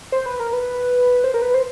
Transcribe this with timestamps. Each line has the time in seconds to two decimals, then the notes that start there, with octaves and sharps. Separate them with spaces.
0.12 C5
0.26 B4
0.40 A#4
0.53 B4
1.24 C5
1.34 A#4
1.42 B4
1.54 C5